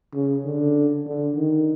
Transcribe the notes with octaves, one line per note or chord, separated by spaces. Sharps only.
C#3
D3
D3
D#3